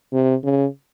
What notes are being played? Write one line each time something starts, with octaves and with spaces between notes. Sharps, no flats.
C3
C#3